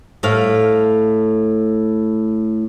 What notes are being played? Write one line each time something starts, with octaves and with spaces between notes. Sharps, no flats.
A2 F5